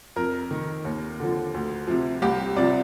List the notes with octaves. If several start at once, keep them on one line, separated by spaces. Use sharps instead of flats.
F2 A#4
D#3
D#2
D3 F3
D2
C3 F3
C2 G4
C3 F3 D5